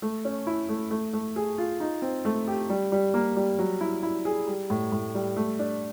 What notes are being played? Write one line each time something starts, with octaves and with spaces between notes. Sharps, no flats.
A3
C#4
E4
A3
A3
A3
G#4
F4
D#4
C4
A3
G4
G3
G3
A#3
G3
F#3
E4
E4
G#4
G3
A2
A2
G3
A3
D4